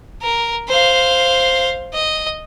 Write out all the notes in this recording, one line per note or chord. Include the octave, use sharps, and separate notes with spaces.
A#4
C5 F5
D#5